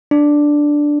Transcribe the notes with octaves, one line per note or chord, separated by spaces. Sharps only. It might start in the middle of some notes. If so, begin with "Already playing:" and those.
D4